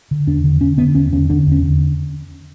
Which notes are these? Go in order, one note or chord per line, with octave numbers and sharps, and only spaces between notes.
D3
E2 D4
D3
D3 C#4
D3 B3
E2 C#4
D3 C#4
D3 D4
E2
C#4
D3